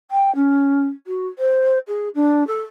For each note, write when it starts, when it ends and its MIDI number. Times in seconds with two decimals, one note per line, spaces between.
0.11 0.33 79
0.35 0.84 61
1.07 1.27 66
1.38 1.78 72
1.87 2.08 68
2.15 2.46 62
2.47 2.61 69